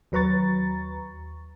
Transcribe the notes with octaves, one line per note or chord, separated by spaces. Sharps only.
D#2 F#3 B4 A#5 C#6 A6